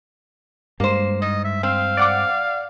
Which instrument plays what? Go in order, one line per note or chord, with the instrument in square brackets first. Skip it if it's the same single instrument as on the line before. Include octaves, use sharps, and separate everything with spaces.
[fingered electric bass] G2 G#3 [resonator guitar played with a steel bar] A#3 C5
[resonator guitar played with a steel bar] G#2 [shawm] D#5
[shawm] E5
[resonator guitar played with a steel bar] C4 [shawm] F5
[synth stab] D5 F#5 D6